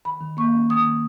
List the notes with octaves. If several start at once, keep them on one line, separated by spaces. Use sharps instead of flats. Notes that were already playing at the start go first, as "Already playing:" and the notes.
D#3 B5
D#3
A#3 C#6
C#4
D#3 D#6
D#3